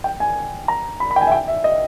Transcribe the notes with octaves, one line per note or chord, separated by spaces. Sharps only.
G5
G#5
A#5
B5
B5
G5
G#5
E5
G5
E5
D#5